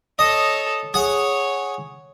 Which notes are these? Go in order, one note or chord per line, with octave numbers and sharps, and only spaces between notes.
A4 C#5 D#5
G#4 C#5 F#5